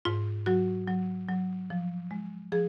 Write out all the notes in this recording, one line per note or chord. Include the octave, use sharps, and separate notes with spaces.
G#2 F4
F#3 F#4
F#3
F#3
F3
G#3
F3 G#4